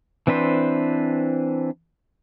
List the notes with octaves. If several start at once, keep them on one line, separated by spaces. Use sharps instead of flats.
E3 C4 D4 B4 C5